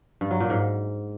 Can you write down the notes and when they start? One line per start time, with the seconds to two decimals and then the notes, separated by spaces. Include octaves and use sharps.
0.21 G2
0.31 F#3
0.40 A#2
0.50 G#2